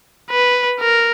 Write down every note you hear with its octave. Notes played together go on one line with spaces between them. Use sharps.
B4
A#4